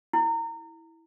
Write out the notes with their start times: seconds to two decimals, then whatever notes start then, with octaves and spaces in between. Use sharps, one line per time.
0.13 E4